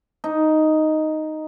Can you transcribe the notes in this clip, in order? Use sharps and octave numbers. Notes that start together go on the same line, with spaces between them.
D#4